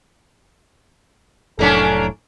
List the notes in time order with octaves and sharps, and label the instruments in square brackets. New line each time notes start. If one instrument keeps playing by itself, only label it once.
[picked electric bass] F1 A2 F#3 [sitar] A#3 C#4 D4 [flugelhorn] A4